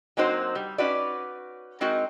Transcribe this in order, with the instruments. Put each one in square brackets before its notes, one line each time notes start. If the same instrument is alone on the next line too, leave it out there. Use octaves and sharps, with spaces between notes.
[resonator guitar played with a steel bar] F#3 A#3 C4 D#4 F#4 C5
G3
C#4 D#4 F#4 B4 D5
G#3 C4 D#4 F#4 A#4